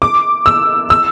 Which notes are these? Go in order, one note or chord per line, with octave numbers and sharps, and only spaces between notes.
D6
E6
E6